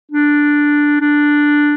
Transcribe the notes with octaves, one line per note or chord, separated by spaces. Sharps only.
D4
D4